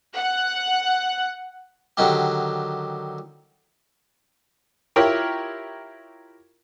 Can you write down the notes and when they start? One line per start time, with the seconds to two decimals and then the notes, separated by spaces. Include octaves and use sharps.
0.16 F#5 F#6
1.97 D3 D#3 F#3 G4
4.96 E4 F4 G4 A#4 C#5